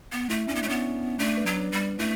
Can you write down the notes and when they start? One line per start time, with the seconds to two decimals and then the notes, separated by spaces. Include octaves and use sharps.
0.12 B3
0.29 A3 E4
0.48 C#4 D4
0.55 B3
0.63 A3
0.66 B3 C#4
1.19 A3 D4
1.37 B3
1.46 F#3
1.54 D4
1.72 G3
1.99 A3 E4